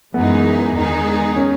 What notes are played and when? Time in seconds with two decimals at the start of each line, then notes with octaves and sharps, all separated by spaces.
0.14 F#2 E3 G#3 B3 D#4 G#4
0.75 E2 D#3 G#3 D#4 G#4
1.36 C#4